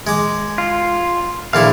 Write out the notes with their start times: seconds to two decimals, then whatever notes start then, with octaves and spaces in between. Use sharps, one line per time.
0.07 G#3 D6
0.58 F4
1.53 A#1 D3 E4 F5